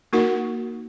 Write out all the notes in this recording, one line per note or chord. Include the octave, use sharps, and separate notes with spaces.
A#3 D#4 F#4 A#4 F#5